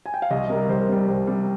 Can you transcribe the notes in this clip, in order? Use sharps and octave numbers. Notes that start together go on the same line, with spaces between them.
G#5
G5
F5
C2 D#5
C3 G3 A#4
C2 C5
A#4
C3 G3 C5
C2
C3 G3